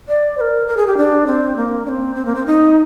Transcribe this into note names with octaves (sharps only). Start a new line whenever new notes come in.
D5
C5
A#4
A#4
G#4
G4
D4
C4
A#3
D4
C4
C4
A#3
C4
D#4